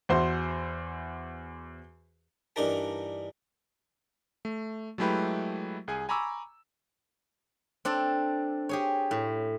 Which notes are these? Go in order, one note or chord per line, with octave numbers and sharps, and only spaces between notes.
E2 F#4 C5 E5 C6
G2 E3 D4 D#4 A#4 A5
A3
F#3 G#3 A3 E4 G4 B4
C2 G#4 G#5
G#5 A#5 B5 C#6 D6 E6
C4 D4 A4
G4 G#4 C#5
A2